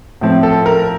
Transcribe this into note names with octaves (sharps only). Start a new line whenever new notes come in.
A2 F3 C4
A4
A#4